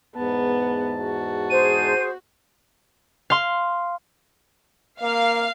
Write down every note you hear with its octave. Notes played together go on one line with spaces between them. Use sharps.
E2 G#2 B3 A5
F#4
G#4 C5 D#7
F5 C6
A#3 F5